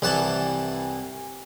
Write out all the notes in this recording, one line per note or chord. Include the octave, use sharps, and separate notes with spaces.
C2 E3 F#5 A5